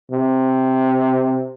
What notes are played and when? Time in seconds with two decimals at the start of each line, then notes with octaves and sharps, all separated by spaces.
0.12 C3